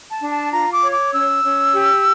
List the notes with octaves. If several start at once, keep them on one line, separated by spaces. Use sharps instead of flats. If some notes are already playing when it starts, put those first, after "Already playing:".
A5
D4
A5
F4 A#5
D6
C#5
D6
C#4 E6
C#4
G4